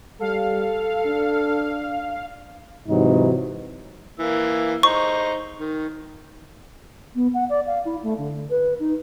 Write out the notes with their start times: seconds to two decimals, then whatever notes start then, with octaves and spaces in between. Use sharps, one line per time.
0.20 G3 A4 F5
1.06 D4
2.89 G#2 C3 E3 F#3 D#4
4.19 E3 A#3 E6
4.83 D#4 C5 C#6
5.59 D#3
7.15 B3
7.34 F#5
7.49 D5
7.66 F5
7.85 E4
8.02 A3
8.17 D3
8.49 B4
8.79 D#4